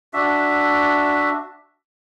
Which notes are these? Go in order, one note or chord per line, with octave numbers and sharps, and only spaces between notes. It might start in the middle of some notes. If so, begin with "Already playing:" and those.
D4 F#4 E5